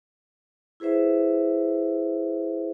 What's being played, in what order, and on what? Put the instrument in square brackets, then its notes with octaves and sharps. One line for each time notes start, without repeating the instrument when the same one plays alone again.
[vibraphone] E4 G#4 B4 C5 E5